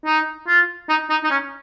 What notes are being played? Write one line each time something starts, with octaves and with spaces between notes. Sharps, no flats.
D#4
F4
D#4
D#4
D#4
C#4